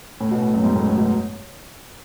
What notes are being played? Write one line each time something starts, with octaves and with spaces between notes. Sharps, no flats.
A2
B2
A2
F#2
G#2
A2
A2
B2